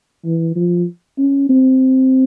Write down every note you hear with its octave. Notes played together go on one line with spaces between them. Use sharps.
E3
F3
C#4
C4